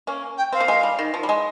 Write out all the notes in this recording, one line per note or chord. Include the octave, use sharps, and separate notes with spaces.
A#3 C#4
G5
C4 F5
A#3
G#3
G3
D#3
F3
G3
G#3